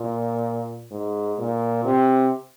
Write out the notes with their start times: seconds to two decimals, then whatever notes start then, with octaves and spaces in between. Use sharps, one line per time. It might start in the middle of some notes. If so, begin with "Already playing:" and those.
Already playing: A#2
0.91 G#2
1.39 A#2
1.85 C3